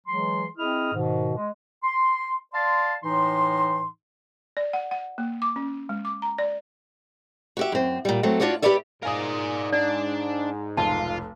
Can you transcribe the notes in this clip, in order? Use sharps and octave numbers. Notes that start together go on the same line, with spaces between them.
E3 F#3 G#3 G#4 C6
C4 E4 G#4 D#5 D#6 F6
G#2 B2 D#3
G#3
C6
D5 F5 A5 C6
A2 E3 D#4 C6
D5
F#5
F#5
A#3
D6
C#4
G#3
D6
A#5
D5
F#4 G4 E5
F#2 C4
A#2 G3
F#3 A3 C4
D4 F4 F#4 C#5 D5
G4 G#4 B4 C#5 D5 E5
G#2 A#4 D5 F5 G#5 D#6
D4 D5
F1 B1 F4 A5